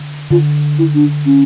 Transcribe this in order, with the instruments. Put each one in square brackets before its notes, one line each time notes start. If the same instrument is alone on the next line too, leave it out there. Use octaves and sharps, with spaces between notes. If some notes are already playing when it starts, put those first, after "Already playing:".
Already playing: [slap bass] D3
[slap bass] D3 [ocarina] F4
[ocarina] E4
D4
C#4